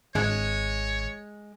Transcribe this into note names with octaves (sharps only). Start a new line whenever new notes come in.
G#1 G#3 C#5